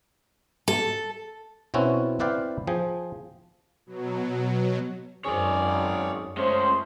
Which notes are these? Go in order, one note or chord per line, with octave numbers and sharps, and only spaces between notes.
A4
B2 C4 C#4 E4 F#4
C4 E4 B4 D5 F5 G5
F3 G#4 G5
B2 F#3
G#1 F#2 C#4 G#4 C#5 D5
G#3 A3 C#4 C5